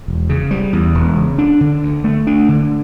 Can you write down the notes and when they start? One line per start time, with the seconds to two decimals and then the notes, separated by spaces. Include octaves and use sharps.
0.08 E1
0.29 C#3
0.51 G3
0.73 E2
0.95 E1
1.17 C#3
1.38 D4
1.61 D3
1.83 D2
2.04 A3
2.27 D4
2.49 D3